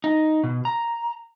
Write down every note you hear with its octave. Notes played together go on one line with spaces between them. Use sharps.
D#4
B2
A#5